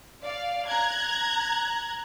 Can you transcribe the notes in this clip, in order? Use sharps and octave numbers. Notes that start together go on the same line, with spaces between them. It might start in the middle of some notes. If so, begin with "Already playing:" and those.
D5 F5
A#5 F#6 G#6